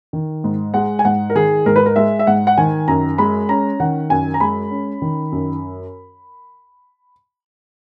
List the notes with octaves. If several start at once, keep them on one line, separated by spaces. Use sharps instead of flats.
D#3
G#2
G#3 F#5
G#5
G#2 F#5
A#4
D#3 G#4
G#2 A#4
B4
A#4
G#3 E5
E5
G#2 F#5
F#5
D#3 G#5
F#2 A#5
G#3 B5
C#4 A#5
D#3 F#5
F#2 G#5
A#5
G#3 B5
C#4
D#3
F#2